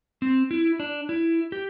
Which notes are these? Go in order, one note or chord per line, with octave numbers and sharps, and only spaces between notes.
C4
E4
D4
E4
G4